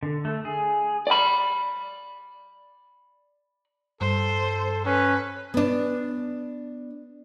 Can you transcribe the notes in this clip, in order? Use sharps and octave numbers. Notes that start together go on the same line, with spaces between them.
D3
A3
G#4
D5 B5
G2 A4 C5
C#4 B4
B3 D4